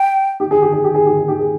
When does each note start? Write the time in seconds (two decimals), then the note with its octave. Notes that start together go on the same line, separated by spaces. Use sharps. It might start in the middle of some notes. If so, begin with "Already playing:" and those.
Already playing: G5
0.40 G4
0.51 G#4
0.62 G4
0.72 G#4
0.84 G4
0.95 G#4
1.06 G4
1.17 G#4
1.28 G4
1.39 G#4